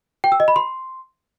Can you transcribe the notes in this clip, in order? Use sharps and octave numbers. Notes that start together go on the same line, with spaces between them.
G5
E6
D#5
B5
C6